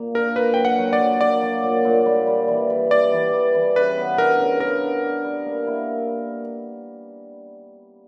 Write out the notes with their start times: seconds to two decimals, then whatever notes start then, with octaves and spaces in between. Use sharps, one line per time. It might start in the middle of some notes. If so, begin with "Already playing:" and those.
Already playing: A#2 A#3
0.15 D4 A#4
0.36 A#2 B4
0.54 F#3 G5
0.65 F#5
0.79 F#3
0.93 D5
0.99 F#3
1.21 A#3 D5
1.42 F#3
1.63 A#2
1.85 A#2
2.06 G3
2.27 G3
2.48 E3
2.70 G3
2.91 E3 D5
3.13 E3
3.33 G3
3.55 E3
3.76 C#3 B4
3.97 B3
4.18 D4 A#4
4.40 C#3
4.60 D4 A#4
4.82 D4
5.04 D4
5.24 G3
5.46 A#3
5.67 E4